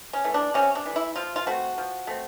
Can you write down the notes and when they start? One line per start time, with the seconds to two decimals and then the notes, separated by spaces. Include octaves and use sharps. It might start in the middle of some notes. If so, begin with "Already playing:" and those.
0.13 C#4
0.24 E3 A3
0.34 D4
0.54 C3 C#4
0.75 D4
0.86 E3 A3
0.96 E4
1.16 F3 F4
1.36 F4
1.46 A3 C4 F#4
1.78 F3
2.07 A3 C4